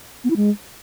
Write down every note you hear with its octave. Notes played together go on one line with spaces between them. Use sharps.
B3
E4
G#3